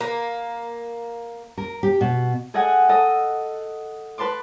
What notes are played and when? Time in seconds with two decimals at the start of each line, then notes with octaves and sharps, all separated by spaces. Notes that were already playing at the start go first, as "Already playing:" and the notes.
0.01 A#3
1.58 A#4
1.83 G4
2.01 B2
2.54 G#4 A4 D#5 F#5 G#5
2.89 A4 D#5
4.18 B4 A5 C6 D6